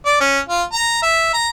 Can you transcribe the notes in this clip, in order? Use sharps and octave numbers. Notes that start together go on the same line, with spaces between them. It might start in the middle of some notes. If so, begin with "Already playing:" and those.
D5
C#4
F4
A#5
E5
A#5